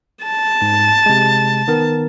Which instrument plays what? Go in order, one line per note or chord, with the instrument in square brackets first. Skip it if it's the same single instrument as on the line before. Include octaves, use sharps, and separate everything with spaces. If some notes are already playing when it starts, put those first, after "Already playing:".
[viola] A5
[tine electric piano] G#2
C3 G#3
D#3 B3 A#4